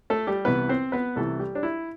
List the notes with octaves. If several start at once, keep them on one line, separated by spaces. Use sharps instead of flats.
A3 A4
G3 G4
C2 C3 E3 B3 B4
C4 C5
B3 B4
C2 C3 E3 A3 A4
G3 G4
D4
E4